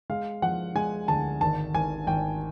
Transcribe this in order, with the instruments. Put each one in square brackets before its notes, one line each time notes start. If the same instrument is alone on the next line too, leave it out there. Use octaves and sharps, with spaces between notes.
[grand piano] G#3 F5
F3 F#5
G#3 G#5
D2 A5
G#1 A5
G#1 G#5
G#1 G5